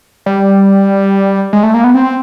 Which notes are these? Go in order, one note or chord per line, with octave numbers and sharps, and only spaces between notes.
G3
G#3
A3
A#3
B3
C4